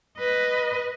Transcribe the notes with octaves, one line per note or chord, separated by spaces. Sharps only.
B4 D#5